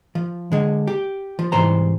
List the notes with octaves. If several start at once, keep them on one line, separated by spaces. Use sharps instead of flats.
F3
D3 G#3
G4
F3
C2 G#2 E3 C5 A#5